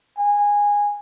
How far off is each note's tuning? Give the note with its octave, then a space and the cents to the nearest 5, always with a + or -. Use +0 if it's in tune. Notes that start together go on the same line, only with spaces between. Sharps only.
G#5 -15